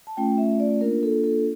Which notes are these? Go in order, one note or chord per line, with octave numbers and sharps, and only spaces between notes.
A5
A3 C#4 F4 G5
E5
D5
A#3 D4 F4 A#4
A4
A4